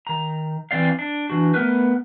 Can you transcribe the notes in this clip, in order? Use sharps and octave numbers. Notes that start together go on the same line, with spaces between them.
D#3 A#5
E3 C4 D5 F5
D4
E3 D4 F#4
A3 B3 A#4 B4